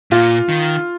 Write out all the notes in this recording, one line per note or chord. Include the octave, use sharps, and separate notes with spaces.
A#2 F4
D#3